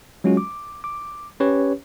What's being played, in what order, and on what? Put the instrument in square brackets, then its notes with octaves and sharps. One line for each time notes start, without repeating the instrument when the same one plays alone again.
[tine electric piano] F#3 G#3 C#4 F4 F#4
D6
D6
C#4 G4 B4 C#5